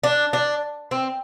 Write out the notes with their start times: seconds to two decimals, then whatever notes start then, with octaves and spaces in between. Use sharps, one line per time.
0.04 D4
0.33 D4
0.91 C4